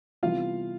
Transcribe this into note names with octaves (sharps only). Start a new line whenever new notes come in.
C3 E3 G3 B3 F4 F5